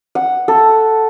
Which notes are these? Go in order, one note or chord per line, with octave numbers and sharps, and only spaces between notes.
F#5
A4